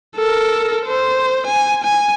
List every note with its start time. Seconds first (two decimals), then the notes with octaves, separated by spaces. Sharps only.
0.16 A4 A#4
0.86 C5
1.46 G#5
1.83 G#5